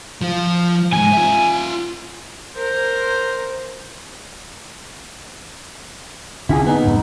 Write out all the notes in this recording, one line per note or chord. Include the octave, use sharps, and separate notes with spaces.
F3 F4
E2 G#2 G#5
F4 E5
A#4 C5
D3 C4 C#4 E4 G4 G#4
B3 D#4
F2 G#2 C#3